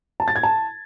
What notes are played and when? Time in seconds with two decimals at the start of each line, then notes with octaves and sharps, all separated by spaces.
0.20 A5
0.28 A6
0.36 G#6
0.43 A5